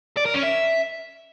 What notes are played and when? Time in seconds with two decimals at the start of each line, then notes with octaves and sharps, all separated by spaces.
0.17 D5
0.26 A#4
0.35 C#4
0.43 E5